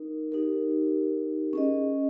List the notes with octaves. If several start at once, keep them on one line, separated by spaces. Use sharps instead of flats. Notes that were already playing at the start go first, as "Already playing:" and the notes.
Already playing: D#4 A#4
D#4 G4 A#4
C#4 G#4 D#5